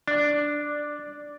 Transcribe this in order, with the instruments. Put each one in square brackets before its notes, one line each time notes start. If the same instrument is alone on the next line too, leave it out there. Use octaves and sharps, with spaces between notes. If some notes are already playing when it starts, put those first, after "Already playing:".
[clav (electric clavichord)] D4 [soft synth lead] D5